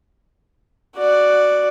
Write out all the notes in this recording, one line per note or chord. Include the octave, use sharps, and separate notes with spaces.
F#4 D5